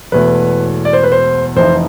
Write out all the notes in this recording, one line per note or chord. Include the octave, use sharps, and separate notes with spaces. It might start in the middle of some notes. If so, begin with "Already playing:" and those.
E1 E2 B2 A3 B4
D5
C5
B4
C5
F1 F2 E3 C5